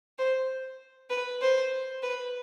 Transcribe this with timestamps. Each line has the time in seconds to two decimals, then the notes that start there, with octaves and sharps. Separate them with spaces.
0.18 C5
1.10 B4
1.41 C5
2.03 B4